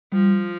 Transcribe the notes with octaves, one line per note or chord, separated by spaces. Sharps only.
F3 G3